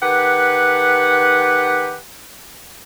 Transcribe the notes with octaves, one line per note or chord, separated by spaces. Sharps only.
D#3 G4 B4 F#5